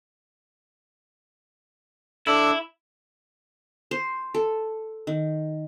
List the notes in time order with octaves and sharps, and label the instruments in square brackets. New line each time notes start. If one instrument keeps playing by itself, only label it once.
[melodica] D4 A4 [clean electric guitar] E4
[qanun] C5
A4
D#3